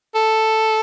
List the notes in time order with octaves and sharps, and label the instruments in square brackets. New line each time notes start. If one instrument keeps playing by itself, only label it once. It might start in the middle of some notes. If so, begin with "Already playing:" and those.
[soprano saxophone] A4